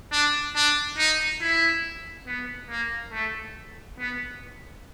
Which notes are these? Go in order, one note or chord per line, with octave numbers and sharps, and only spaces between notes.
D4
D4
D#4
E4
B3
A#3
A3
B3